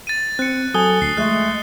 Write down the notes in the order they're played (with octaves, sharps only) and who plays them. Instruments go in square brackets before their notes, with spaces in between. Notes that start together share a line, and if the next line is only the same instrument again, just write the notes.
[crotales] A6 D#7
[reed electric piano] C4 [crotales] F#6 C#7
[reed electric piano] F#3 A4 G#5 [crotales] D#6 G7
[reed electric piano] D2 [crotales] C7
[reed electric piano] F3 [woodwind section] G#3 A3 [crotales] F#6